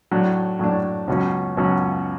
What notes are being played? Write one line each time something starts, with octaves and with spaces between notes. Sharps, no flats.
A2 F#3 A3 D4
A2 F#3 A3 D4
C#2 B2 F#3 C#4
C#2 B2 F#3 C#4